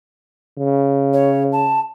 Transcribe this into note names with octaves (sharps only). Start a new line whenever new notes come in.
C#3
C#5
A5